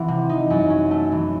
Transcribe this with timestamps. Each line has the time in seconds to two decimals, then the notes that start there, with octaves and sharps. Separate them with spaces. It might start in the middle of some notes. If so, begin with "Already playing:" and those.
Already playing: E3 C4 F#5
0.08 C3
0.30 D#4
0.50 F#2
0.70 C#4
0.91 A3
1.12 E3